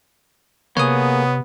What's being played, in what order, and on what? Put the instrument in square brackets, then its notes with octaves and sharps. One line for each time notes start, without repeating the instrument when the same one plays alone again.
[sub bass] C3 [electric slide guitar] A#3 G#4 [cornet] B3 [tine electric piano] C#5 F#5 D#6